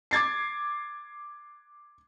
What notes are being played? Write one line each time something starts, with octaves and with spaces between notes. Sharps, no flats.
D6 G#6 A6 C7